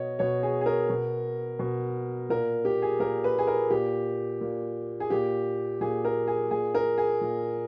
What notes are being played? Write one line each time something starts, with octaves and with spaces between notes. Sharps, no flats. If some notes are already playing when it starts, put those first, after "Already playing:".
Already playing: B2 C#5 D#5
B2 C#5
G#4
G#4
A#4
B2
B2
A#2 A#4
G4
G#4
A#2 A#4
B4
G#4
A#4
A#2 G4
A#2
G#4
A#2 G4
A#2 G#4
A#4
G#4
A#2 G#4
A#4
G#4
A#2